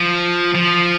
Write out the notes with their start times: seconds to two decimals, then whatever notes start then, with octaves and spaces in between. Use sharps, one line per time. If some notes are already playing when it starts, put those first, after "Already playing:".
Already playing: F3
0.55 F3